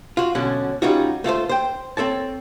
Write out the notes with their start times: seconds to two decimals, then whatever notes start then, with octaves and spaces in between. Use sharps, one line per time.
0.17 F4 F#4
0.35 B2 D3 F#3 C#4
0.82 G3 C#4 D#4 F4 F#4
1.24 A3 F4 A4 C5
1.49 C5 G5
1.97 C4 A4 C#5 A5